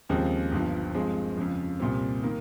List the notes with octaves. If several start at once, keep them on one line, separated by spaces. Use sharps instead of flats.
D#2 C#3 F3 G#3 C4
G1 G2 F3
G2 F3 G#3 C4
F2 C#3 F3
C2 A#2 G3 C4
D#3 A#3